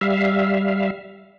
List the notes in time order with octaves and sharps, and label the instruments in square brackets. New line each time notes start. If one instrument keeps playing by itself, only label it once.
[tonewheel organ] G3 E5 F5